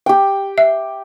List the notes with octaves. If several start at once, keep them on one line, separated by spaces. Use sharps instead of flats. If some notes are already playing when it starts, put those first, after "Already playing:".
G4 G5
E5